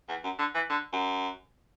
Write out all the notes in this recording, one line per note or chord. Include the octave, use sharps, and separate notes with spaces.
E2
F#2
D3
E3
D3
F#2